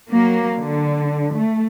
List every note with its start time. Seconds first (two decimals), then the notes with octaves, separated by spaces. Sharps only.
0.10 F#3 A#3
0.57 D3
1.34 A3